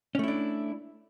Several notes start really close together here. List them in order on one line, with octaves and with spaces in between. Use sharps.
C#4 A3 E4 D4